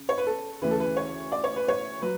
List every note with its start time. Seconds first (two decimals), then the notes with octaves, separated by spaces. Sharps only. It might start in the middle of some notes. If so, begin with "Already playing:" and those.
Already playing: C#3
0.09 C#5
0.18 B4
0.27 A4
0.62 D2 C#3 E3 B4
0.71 A4
0.80 B4
0.97 C#5
1.32 D5
1.44 C#5
1.56 B4
1.68 C#5
2.02 F#3 B4